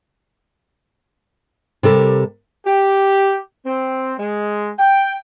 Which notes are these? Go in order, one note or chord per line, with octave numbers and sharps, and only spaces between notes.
C3 G3 A4 A#4
G4
C4
G#3
G5